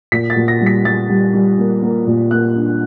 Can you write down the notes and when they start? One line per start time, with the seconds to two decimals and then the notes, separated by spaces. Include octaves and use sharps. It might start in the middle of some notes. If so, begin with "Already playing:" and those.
0.12 A#2 B6
0.30 A6
0.36 A#2
0.48 A#6
0.61 G3
0.66 B6
0.85 G3 A6
1.09 G3
1.34 G3
1.58 A#3
1.82 A#3
2.07 A#2
2.31 A#3 F#6
2.56 D4